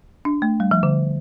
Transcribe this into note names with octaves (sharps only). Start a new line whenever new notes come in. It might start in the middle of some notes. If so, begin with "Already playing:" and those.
D4
A3
G3
F3
D3